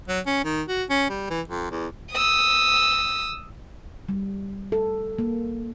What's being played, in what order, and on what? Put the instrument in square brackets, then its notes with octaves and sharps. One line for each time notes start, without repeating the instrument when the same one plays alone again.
[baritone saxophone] F#3
C#4
D#3
F#4
C#4
G3
E3
F2
E2
[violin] D#6 E6
[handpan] G3
A4
A#3